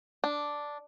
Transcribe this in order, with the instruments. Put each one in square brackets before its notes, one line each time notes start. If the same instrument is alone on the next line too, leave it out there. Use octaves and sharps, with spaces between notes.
[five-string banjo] D4